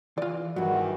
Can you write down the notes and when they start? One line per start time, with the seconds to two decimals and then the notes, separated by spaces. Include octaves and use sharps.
0.18 E3 F4 D5
0.56 E2 G2 D#3 F#3 F#4